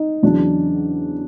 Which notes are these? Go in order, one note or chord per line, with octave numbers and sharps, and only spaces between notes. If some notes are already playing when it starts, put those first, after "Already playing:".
Already playing: D#4
E2 C#3 F#3 D4